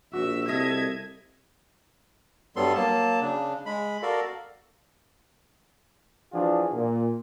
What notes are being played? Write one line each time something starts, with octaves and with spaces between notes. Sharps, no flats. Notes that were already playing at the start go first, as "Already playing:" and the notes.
A#1 F#4 E5
C2 A4 D#5 E5 G#6
G2 F#3 G3 B3 A4 C6
F#3 A#3 A5
C#3 D4
G#3 B5
F#4 A4 A#4 D5 F5
E3 F3 D4 F4 F#4 G#4
A#2